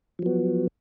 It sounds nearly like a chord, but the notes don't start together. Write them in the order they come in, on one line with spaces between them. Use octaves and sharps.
F3 F#3 B3